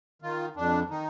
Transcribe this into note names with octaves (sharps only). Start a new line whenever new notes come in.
D#3 F4
F2 D4
D#3 D#4